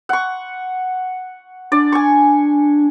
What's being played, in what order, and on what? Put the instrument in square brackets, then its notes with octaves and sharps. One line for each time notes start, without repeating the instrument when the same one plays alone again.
[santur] F#5 C#6
[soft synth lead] D4 [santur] D5
[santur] G#5 C#6